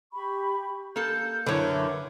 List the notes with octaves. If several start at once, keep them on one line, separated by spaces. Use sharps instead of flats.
G4 B5 C#6
A#3 A4 G6
F#2 D3 E4 A#4 B4 C#5